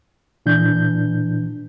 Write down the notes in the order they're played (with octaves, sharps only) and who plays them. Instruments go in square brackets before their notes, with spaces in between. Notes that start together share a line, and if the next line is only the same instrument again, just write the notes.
[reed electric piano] A#2 E3 D4 G6